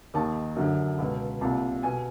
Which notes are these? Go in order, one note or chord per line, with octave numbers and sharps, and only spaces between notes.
D#2 D#3 A5
F#2 D3
C#2 B2
C2 A#2 A5
B2 G#5